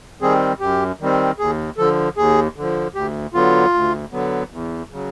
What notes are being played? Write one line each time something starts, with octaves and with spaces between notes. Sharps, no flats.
D#3 G3 C4 G#4
F#2 G4
D#3 G3 C4
D#2 G#4
D3 F3 A4
D#2 G#4
D3 F3
D2 G4
D3 F#3 B3 F4
D2
D3 F#3 B3
E2
C#3 F#3